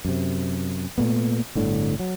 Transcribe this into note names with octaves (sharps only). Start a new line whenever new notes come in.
F#2 C3
A#2 A3 B3
G1 A2 D3
F#3